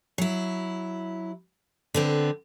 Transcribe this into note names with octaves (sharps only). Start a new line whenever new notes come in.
F#3 E4
D3 B3 C4